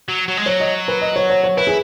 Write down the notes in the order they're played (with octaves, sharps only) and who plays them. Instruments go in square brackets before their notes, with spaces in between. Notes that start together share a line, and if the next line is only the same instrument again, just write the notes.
[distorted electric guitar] F#3
F#3
G#3
[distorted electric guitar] F#3 [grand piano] C#5
[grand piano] D#5
B4
D#5
C#5
C#5
C#5
[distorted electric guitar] E4 [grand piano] B4
[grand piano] G#4